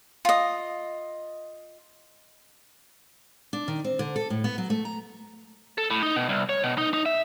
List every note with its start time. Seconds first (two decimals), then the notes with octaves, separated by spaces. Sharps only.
0.25 F4 D#5
3.53 D4
3.68 D#3
3.84 C4
3.99 D3
4.16 A4
4.30 A2
4.44 B3
4.58 F#3
4.70 A3
4.85 A#5
5.78 A4
5.90 A2
6.03 D#4
6.16 B2
6.29 C2
6.49 C#5
6.64 B2
6.78 D#4
6.94 D#4
7.06 E5